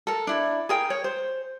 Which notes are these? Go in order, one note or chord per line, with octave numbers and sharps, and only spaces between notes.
A4 A#4
D4 E4
G#4 A#4 G5
C#5
C5